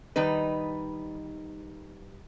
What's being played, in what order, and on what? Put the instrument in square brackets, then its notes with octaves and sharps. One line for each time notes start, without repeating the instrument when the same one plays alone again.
[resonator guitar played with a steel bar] D#3 G3 D#4 B4